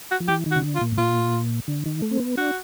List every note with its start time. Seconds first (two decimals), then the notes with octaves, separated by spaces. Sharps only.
0.11 F#4
0.20 F3
0.28 E3 G4
0.46 D#3
0.51 F#4
0.56 C#3
0.63 D3
0.75 F4
0.81 A#2
0.92 A2
0.97 A#2 F4
1.68 D3
1.86 D#3
2.02 A3
2.11 C4
2.20 B3
2.37 D4 F#4